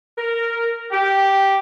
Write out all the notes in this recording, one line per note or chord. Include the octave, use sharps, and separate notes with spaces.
A#4
G4